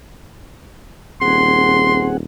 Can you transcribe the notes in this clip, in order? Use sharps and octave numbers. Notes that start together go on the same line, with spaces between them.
D#1 C4 G#4 F#5 C6